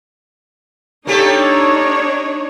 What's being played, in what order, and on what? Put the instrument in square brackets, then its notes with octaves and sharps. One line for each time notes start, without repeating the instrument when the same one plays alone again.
[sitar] A#3 G4 A4 [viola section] D4 D#4 C#5